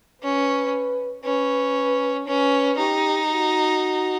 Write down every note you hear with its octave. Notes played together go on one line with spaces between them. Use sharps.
C#4 B4
C#4 B4
C#4 B4
D#4 G4
F#4